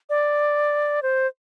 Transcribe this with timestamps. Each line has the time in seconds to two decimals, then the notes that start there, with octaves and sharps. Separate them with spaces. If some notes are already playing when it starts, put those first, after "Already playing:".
0.10 D5
1.02 C5